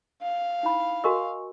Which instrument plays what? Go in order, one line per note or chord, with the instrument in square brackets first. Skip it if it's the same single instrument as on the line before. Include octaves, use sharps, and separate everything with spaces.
[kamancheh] F5
[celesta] D#4 E4 B5
[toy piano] F#4 A#4 D#5 [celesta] G#5 C#6 E6